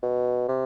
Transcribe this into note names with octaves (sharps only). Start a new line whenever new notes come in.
B2
C3